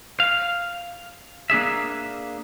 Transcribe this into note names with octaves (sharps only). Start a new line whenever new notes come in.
F5
A#3 D4 G#4 E5